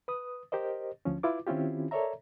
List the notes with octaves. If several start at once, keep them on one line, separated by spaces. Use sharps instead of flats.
B4 D#6
G4 A#4 C5 D#5
D2 F3 C#4
E4 F4 B4 D6
D#3 C4 C#4 E4 F4 G4
A4 A#4 C#5 D5 E5 A#5